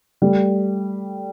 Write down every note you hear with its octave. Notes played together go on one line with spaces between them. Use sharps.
G3 A3